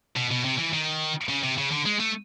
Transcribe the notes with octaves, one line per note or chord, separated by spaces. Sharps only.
B2
B2
C3
E3
D#3
C#3
C3
C#3
D3
G#3
A3